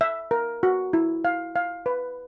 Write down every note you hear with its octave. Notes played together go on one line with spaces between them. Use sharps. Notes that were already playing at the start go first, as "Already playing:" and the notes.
E5
A#4
F#4
E4
F5
F5
B4